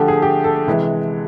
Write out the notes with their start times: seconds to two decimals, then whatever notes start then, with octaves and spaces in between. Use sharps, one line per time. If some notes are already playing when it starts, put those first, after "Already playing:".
Already playing: D3 F3 A3 G4
0.08 G#4
0.22 G4
0.44 A4
0.67 C3 E3 G#3